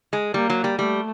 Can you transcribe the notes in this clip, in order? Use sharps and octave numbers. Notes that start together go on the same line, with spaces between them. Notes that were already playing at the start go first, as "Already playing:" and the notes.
G#3
G3 A#3
F#3
G3
G3 A3